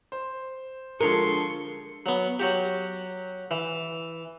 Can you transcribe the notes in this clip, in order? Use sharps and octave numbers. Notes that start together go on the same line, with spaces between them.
C5
D3 F3 G#3 D4 A4 A#4 C6 C#6
F#3 B3
F#3 F#4 G4
E3